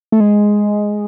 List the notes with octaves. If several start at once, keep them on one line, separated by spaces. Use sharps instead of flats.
A3
G#3